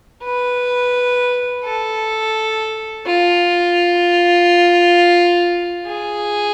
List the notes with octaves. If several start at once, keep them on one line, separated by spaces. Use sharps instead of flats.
B4
A4
F4
G#4